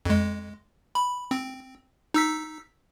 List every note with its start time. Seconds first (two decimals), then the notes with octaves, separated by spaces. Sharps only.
0.05 F2 G#3
0.95 B5
1.31 C4
2.14 D#4 E6 B6